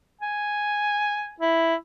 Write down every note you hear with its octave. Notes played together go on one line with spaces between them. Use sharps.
G#5
E4